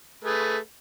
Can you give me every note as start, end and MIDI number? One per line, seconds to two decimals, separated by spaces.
0.24 0.57 57
0.24 0.57 68
0.24 0.57 71